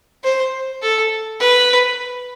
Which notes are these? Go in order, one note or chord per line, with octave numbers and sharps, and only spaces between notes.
C5
A4
B4